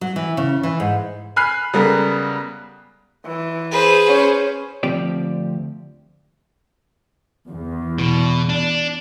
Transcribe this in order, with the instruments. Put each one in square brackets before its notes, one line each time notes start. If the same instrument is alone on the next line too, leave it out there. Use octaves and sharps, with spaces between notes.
[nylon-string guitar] F#3
E3
C#3
E3
G#2
[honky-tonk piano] G#5 B5 F6 F#6 C7
C#3 G3 G#3 B3 A4 A#4
[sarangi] E3
[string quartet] G#4 B4 C5
[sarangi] C#4
[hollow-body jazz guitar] D2 F3 C4 G4 D5
[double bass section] E2
[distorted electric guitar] B2
D4